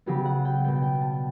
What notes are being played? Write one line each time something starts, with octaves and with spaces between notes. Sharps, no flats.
C#3 F#3 B3 G4
F#5
G5
B2 G3 B3 G5
G5
A5